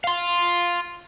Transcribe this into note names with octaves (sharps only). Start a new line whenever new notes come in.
F5 C6